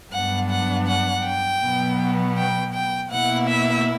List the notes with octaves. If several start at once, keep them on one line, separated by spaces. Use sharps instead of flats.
G2 F#3 B3 D4 F#5
F#5
F#5
G5
B2 F#3 B3
G5
G5
B2 A#3 E4 F#5
E5